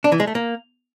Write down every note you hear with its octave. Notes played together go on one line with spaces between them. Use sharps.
D4
E3
G#3
A3
A#3